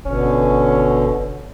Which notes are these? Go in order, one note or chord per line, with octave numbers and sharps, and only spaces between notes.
G1 B2 D3 C#4